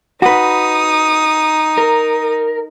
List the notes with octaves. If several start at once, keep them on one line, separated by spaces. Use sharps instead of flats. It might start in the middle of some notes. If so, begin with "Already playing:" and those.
D#4 F#4 B4 D#6
A#4